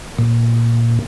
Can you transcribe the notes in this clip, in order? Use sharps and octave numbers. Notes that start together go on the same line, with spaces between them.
A#2